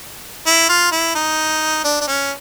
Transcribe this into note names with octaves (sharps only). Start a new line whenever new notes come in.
E4
F4
E4
D#4
D4
D4
C#4